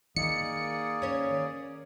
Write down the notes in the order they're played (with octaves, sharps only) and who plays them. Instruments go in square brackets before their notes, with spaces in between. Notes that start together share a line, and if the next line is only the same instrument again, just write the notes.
[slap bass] D#3 [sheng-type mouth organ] A#3 G#4 D5 [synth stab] C#7
[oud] C#4 C#5